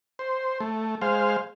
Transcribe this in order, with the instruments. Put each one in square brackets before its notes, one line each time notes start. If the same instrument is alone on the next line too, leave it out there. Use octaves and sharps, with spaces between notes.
[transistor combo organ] C5
A3
G#3 C5 F5